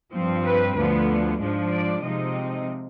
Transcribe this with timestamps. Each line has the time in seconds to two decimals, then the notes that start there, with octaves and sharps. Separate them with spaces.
0.12 G2 F3 C4
0.44 B4
0.75 D2 D3 F3 B3 B4
1.39 G#2 F3 G#3 D4
1.71 D5
2.02 C3 F3 G#3 C4 D#4 D#5